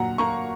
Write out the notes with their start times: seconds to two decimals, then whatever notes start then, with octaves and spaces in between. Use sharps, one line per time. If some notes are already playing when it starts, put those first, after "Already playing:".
Already playing: A#2 F#3 F#5 A#5
0.18 A#3 A#5 C#6